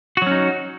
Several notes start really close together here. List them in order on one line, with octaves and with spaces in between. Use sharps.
F#4 F#3 C#4 D#4